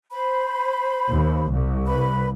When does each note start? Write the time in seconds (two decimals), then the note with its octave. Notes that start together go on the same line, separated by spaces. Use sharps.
0.12 C5 B5
1.09 D#2
1.50 C2
1.86 B4 B5